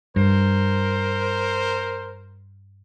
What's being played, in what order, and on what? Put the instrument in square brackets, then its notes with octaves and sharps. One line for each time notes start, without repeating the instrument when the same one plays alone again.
[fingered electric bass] G2 [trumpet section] A#4 C5